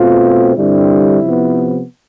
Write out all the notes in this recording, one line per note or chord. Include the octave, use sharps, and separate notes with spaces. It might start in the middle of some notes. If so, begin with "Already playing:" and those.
Already playing: B2 A3 C4 F4
G2 D3 G3 C4 E4
C3 F3 B3